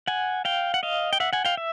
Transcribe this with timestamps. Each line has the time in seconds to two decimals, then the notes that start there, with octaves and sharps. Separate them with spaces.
0.07 F#5 G#5
0.45 F5 G5
0.74 F#5
0.83 D#5 F5
1.13 G5
1.20 E5 F#5
1.33 F#5 G#5
1.45 F5 G5
1.57 E5